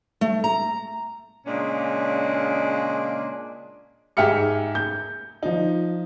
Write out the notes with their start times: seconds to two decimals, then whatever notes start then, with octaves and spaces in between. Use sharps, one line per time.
0.21 A3
0.44 A#5
1.46 A#2 C#3 G#3 C#4 D4
4.17 G#2 G4 G#4 E5 F6 C#7
4.75 G6
5.43 F3 D#4